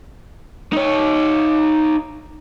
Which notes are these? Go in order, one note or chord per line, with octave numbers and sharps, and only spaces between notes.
D#4 C#5